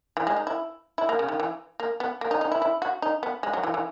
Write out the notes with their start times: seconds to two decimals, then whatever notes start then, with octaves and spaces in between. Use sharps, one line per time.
0.17 E3
0.27 G#3
0.36 D#4
0.47 E4
0.98 E4
1.09 A#3
1.19 C#3
1.29 D#3
1.40 E3
1.80 A#3
2.00 B3
2.21 A#3
2.31 D#4
2.41 D#4
2.52 E4
2.62 E4
2.82 F#4
3.02 D#4
3.23 B3
3.43 G#3
3.53 F#3
3.64 E3
3.74 E3